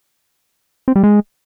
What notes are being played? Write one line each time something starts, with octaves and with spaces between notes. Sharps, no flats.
C4
G3
G#3